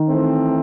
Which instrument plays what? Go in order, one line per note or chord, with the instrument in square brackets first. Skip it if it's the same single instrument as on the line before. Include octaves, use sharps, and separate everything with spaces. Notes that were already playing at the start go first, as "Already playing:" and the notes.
Already playing: [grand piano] D#3
[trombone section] E3 A3 C4